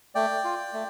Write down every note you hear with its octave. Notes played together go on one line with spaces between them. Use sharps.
A3 D5 G5
F4
A3